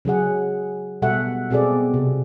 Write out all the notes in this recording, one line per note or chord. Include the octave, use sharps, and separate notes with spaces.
C#3 F#3 G#4 F#5
B2 G3 A4 E5 F#5
B2 C4 G#4 A4 D5
C3